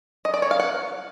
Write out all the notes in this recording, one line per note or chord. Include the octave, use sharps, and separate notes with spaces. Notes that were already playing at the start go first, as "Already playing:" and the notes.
D#5
D5
C#5
F5
F#5